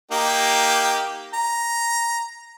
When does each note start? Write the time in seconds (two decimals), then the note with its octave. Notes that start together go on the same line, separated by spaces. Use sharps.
0.11 A#3 D#4 G4
1.34 A#5